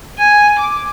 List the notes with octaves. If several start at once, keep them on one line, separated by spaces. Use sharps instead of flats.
G#5
D6